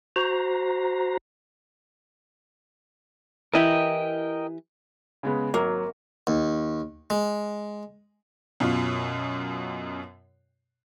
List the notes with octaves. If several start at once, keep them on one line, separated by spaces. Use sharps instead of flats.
F#4 C5 A#5
E3 E4 G4 A#4 D#5 G5
C#3 G#3 B3
G#1 F#3 A#3
D#2
G#3
F#2 B2 F4